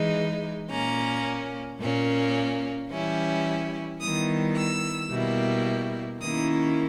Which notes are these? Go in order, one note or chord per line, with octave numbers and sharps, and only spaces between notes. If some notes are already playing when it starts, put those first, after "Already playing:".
Already playing: E3 G#3 D#4
A#2 A#3 C#4 A#5
A#2 A#3 C#4
E3 G3 C#4 E4
D#3 G3 B3 E4 D#6
E6
B2 G3 A#3 E4
D#3 A#3 C#4 E4 D#6